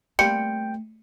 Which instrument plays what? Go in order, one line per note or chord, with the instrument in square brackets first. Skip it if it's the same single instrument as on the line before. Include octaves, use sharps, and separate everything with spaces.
[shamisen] G3 A#3 C4 [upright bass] A3 [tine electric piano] G5 [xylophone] C#7